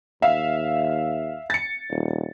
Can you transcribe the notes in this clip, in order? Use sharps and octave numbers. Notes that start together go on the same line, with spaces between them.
D#2 E5 F5
A6 C#7
D#1